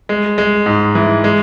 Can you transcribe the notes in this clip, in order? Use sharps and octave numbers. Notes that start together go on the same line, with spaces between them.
G#3
G#3
G#2
E3
G#3